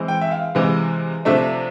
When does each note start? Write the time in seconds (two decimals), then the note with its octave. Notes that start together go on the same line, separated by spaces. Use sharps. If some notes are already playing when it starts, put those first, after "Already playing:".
Already playing: E3 G#3 C4
0.08 G5
0.21 E5
0.31 F5
0.55 C3 E3 G#3
1.25 C3 F3 A3 D4 E5